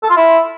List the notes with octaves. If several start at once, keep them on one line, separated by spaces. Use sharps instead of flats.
A4
F4
E4